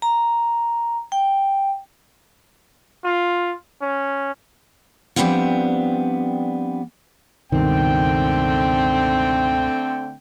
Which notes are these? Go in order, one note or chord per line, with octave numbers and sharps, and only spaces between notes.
A#5
G5
F4
C#4
F3 G3 B3 C4 D4 F4
C#2 G2 B2 D3 D#3 A3 C4 G5